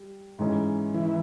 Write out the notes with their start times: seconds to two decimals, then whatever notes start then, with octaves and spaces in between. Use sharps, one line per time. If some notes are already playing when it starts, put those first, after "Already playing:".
Already playing: G3
0.39 G#2 E3 G#3 C#4
0.94 E3